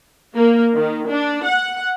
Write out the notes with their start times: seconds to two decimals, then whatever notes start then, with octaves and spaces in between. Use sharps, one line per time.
0.35 A#3
0.74 D#3
1.08 D4
1.45 F#5